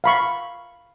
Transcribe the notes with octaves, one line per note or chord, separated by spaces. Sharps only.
F5 B5 C#6